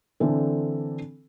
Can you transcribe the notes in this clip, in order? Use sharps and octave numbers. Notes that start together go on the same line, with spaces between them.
D3 E3 C4 D4 A4